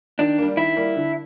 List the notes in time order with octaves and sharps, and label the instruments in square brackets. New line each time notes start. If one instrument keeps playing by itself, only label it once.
[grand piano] D#3 [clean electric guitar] D4
[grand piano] G3 A#3
[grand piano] D#3 [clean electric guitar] E4
[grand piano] G3 A#3
D3